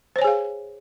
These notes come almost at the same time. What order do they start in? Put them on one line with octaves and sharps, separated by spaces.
C5 C#5 G#5 G#4 F5